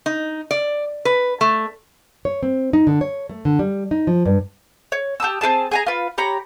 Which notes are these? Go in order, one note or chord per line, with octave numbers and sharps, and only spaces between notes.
D#4
D5
B4
A3
C#5
C4
D#4
D3
C#5
A3
D3
G3
D#4
F3
G2
C#5
G4 A5 D#6 E6
C4 E4 G#4 A5
G#4 G#5 A#5
F4 B4
G4 C#5 A#5 B5